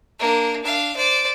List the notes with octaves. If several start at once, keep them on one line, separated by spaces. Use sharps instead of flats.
A#3 D4
D4 F5
C5 D5